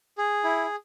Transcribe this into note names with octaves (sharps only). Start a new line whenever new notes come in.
G#4
E4